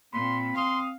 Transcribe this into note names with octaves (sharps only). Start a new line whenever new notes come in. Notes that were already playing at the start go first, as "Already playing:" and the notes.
A#2 C4 B5 C6
F5 C6 D#6